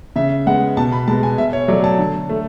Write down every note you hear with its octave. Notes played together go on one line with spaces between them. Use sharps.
C#3 E5
G#3 B3 F#5
B2 A5
B5
G#3 B3 A5
G#5
B2 E5
C#5
F#3 A3 D5
A5
D3
A3